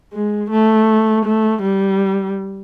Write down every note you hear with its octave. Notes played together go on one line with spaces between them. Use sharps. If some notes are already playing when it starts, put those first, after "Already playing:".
G#3
A3
A3
G3